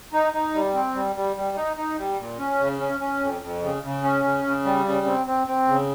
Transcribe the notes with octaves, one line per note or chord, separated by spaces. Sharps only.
D#4
D#4
G3
C4
G3
G3
G3
D#4
D#4
G3
A#2
C#4
C#3
C#4
C#4
F2
F2
C#3
C#3
C#4
C#3
C#3
G3
C#3
C4
C4
C4
C#3